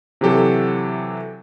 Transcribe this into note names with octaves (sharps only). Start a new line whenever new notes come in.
C3 E3 F#3 G4 A4